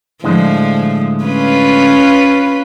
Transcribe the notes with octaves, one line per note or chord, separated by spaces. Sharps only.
A2 D3 F3 G#3
C#4 F4 B4